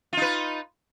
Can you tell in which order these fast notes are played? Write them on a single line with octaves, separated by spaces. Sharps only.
F4 D#4 B4